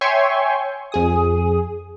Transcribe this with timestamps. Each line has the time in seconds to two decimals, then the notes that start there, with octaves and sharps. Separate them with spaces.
0.01 C#5 E5 G5 G#5 C6 C#6
0.92 F2 G#4 D#6